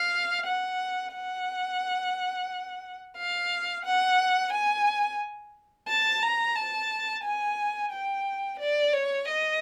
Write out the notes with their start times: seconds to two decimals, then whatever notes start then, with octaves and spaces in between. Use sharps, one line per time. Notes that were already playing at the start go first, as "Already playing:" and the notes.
Already playing: F5
0.46 F#5
1.13 F#5
3.17 F5
3.85 F#5
4.52 G#5
5.88 A5
6.22 A#5
6.55 A5
7.24 G#5
7.92 G5
8.59 D5
8.93 C#5
9.27 D#5